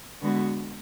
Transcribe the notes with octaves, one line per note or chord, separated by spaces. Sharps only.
D3 G#3 B3 F#4